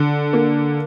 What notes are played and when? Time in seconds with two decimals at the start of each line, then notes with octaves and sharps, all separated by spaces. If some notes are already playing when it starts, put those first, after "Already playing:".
Already playing: D3
0.33 A#3